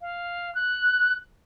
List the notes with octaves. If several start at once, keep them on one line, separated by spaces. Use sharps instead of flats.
F5
F#6